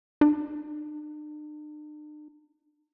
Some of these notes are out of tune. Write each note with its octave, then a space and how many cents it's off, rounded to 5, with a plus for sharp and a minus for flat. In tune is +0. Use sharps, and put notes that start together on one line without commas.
D4 +45